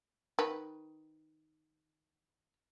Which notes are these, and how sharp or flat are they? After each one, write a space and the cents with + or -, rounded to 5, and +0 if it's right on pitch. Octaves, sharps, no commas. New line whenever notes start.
D#3 +0 B4 +0